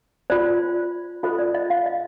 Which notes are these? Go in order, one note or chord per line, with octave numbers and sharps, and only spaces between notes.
F4 C5 D5
F4 A4 C5 D#5
D5
D#5
F5
D#5